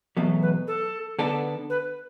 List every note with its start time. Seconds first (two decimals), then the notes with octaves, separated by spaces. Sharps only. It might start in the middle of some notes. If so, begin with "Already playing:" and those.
0.17 E2 B2 F#3 A3
0.42 B4
0.67 A4
1.19 D3 B3 D4 A4
1.70 B4